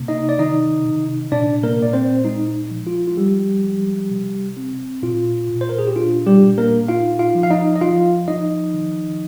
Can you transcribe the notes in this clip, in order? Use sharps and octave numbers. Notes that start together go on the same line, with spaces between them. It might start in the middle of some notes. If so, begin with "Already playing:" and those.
Already playing: C3 A#3
D#4 D#5
D5
D#3 D#4 D#5
C3
A#2 D4 D5
A#3 A#4
A#2 D5
C4 C5
G#3 D#4
F3
F4
F4
G3 G#3 G4
F3
C3
C4
A#2 F4
A#2
C5
A#4
G#4
G4
D4 F4
G3 G4
A#2
A#3 A#4
D#4 F4 F5
F4 F5
F3
F5
D#4 D#5
D#5
F3 F4 F5
F3 D#4 D#5
D#3